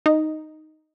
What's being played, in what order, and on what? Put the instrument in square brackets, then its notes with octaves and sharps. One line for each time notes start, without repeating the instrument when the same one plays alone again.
[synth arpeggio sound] D#4